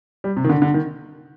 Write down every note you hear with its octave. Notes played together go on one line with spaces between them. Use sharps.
G3
C3
D#3
D3
D3
D#3